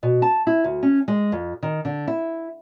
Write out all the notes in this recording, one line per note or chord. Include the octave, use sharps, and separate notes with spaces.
B2
A5
E4
D2
C#4
G#3
F2
D#3
D3
E4